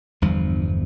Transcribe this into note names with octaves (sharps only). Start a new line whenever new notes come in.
G1 E2 G2 F3